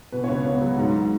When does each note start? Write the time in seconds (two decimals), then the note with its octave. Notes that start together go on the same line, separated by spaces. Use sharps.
0.12 B2 B4
0.24 C#2 C#5
0.45 B3
0.61 F#3
0.77 G#2